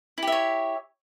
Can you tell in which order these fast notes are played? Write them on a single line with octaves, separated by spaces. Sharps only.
E4 G4 E5 C#5